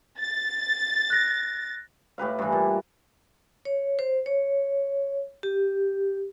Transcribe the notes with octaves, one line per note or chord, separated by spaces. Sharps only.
A6
F#6 A#6
A2 G4 B4 F5
G2 E3
A#2
C#5
C5
C#5
G4